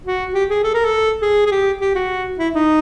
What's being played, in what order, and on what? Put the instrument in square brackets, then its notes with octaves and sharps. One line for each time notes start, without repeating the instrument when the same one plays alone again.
[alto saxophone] F#4
G4
G#4
A4
A#4
A4
G#4
G#4
G4
G4
F#4
E4
D#4